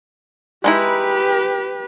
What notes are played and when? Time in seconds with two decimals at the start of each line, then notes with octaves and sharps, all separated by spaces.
0.64 G#3 D#4 E4 G4 B4